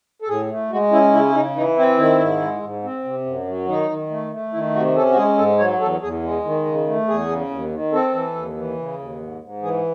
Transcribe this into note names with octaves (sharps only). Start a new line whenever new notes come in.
A4
A2 G#4
A3
G#3 F#4
C#4 E4
C#3 E4
E4
C#3 D#4
E3 D#4
C4 E4
D#3 E4
G#2
G#3
G#2
C4
C3
F#2
F#3
D#3 D#4
D#3
A3
A3
D#3 E4
C3 F#4
C#4 A4
F#4
G#3 G#4
G#2 A4
F#3 C#5
E2 A4
E2 G#4
G#3
D#3
C#3
A3
E2 G#4
C#3
D#2
D#3
C4 A4
E3
D#2
E3
C#3
D#2
G#2
G#2
E3 G#4